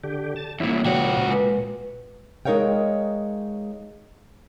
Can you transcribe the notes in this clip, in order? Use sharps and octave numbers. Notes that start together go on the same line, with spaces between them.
D3 G4
A5
E2 A#2 E4 C#5 E5
C#2 A#2 F3 F#4 C#5 D5 G5
A#2 G#3 B4
G#3 D#4 A#4 C#5 F5 G5